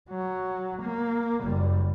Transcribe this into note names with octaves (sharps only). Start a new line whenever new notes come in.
F#3
A#3
F#1 G3